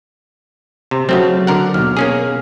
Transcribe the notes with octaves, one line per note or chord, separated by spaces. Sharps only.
C3
C#3 F#3 A3 C4 F#4
D3 A#4 F#5
D#2 B2 F6
A#3 C#4 G#4